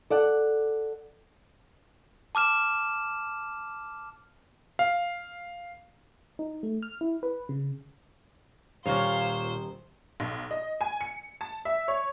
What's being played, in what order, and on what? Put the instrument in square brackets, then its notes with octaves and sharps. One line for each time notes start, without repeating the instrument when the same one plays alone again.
[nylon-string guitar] A4 D5 F#5
[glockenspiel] A5 D6 F6 E7
[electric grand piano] F5
[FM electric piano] D#4
A3
F6
E4
B4
C#3
[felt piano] D#1 [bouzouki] A#2 E3 C#5 [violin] C5 [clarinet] F5
[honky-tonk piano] B1
D#5
G#5
C#7
A5
E5
C#5